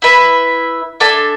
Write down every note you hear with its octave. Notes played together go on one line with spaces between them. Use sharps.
E4 B4 E5
D4 A4 E5 G#5